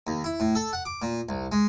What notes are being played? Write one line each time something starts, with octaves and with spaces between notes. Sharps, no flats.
D#2
E4
A2
A4
F#5
D6
A#2
C2
G#3